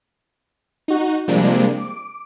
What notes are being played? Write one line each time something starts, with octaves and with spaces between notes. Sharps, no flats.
D#4 F#4
C3 F3 G3 G#3 A#3 D4
D6